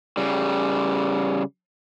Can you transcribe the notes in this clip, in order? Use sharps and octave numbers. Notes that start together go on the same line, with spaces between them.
C#3 G3